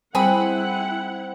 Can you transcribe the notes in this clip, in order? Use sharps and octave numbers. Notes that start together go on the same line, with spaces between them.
G3 C4 E4 G#4 F#5 B5